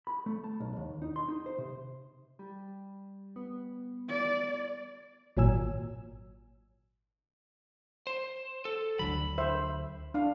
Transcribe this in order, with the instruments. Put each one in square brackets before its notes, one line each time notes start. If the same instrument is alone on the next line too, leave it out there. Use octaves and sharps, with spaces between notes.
[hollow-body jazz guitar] B5
A3
A5
B1
D#2
D#4
C6
D#4
C5
C3
[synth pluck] G3
B3
[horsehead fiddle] D5
[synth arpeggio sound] G#1 A#2 F#3 G#5 E6
[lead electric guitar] C5
A4
[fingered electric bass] D2 D3 F#3 [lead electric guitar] B5
[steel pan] C5 E5
D4 F5